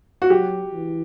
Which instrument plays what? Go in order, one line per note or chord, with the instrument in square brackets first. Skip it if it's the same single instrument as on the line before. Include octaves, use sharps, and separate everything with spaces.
[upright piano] F#4
[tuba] F#3 [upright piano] G4
[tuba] E3